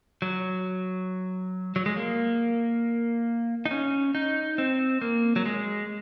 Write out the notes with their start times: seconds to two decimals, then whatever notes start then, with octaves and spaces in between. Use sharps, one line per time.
0.22 F#3
1.76 F#3
1.86 G#3
1.97 A#3
3.66 D#4
3.71 C#4
4.15 D#4
4.58 C4
5.02 A#3
5.36 F#3
5.46 G#3